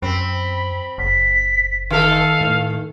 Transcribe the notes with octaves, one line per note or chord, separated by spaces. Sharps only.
F#2 C4 B5
F#1 B6
D#3 A4 F5
A2